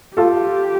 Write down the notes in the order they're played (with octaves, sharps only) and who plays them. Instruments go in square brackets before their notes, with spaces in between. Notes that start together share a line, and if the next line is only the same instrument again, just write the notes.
[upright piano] F4 A4 [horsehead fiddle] G4